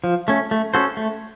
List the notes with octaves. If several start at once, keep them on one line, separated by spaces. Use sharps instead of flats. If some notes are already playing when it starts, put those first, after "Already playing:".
F3
A3 C#4
A3
C#4 F#4 A4 C5
A3